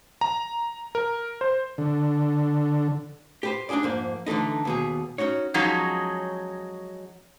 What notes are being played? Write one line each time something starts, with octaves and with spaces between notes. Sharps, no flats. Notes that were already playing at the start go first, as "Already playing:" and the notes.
A#5
A#4
C5
D3
G4 B4 C5
D4 D#4 F#4 G#4 D5
F2 G#2 A#3
D3 E3 F#3 A3 D#4
D#2 B2 G#4
C#4 D#4 F#4 C#5
F3 F#3 G#3 C#4 D#4